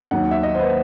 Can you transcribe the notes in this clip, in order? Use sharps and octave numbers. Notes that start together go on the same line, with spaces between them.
D#2 D#3 F#3 F#5
E5
D#5
C5
B4